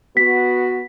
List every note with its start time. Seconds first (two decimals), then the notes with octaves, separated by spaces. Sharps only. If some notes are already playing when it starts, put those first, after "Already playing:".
0.17 B3 F#4 B6